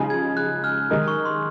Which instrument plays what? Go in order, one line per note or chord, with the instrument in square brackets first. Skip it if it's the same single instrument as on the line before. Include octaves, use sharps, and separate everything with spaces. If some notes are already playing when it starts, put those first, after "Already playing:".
Already playing: [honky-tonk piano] C#3 F3 G#3 D#4 G#4
[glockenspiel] G#6
F#6
F6
[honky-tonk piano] D#3 G#3 D#4 A#4 [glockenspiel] D#6
[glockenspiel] C#6
C6